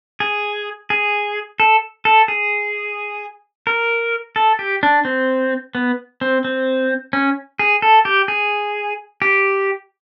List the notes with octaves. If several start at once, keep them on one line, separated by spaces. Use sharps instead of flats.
G#4
G#4
A4
A4
G#4
A#4
A4
G4
D4
C4
B3
C4
C4
C#4
G#4
A4
G4
G#4
G4